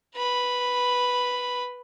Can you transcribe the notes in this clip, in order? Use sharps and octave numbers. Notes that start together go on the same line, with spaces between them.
B4 B5